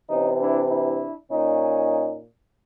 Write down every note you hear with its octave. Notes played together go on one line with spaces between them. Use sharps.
C3 E3 C#4 D#4
D4 E4
D4 E4
A#2 C#4 D#4